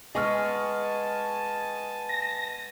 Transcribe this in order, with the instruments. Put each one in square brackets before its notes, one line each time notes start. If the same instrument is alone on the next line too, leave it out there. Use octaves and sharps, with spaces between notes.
[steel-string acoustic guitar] G#3 B3 G#4 [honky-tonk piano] D#5 C#6 F6 [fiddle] G#5 A5
[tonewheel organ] A#6